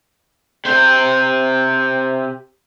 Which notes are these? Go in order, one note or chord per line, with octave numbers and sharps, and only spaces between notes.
C3 C5